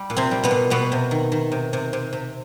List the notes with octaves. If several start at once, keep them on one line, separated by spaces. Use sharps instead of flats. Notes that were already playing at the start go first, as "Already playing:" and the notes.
Already playing: G3
A#2
C3 C4
G3
B2 B3
A#2
B2 G3 B3
C3
D#3
D#3
C3
C3
C3
C3